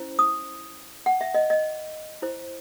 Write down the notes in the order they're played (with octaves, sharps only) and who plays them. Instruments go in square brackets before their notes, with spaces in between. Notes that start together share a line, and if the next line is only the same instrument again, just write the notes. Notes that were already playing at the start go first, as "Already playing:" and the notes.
Already playing: [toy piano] C#4 E4 C5
D#6
F#5
E5
D#5
D#5
E4 C5